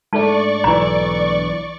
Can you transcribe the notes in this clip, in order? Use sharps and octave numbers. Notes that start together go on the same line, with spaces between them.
G#2 A3 D4 D5 A5 C#6
B1 E3 A#5